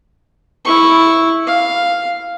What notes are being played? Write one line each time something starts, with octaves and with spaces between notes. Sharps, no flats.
E4 C#6
F5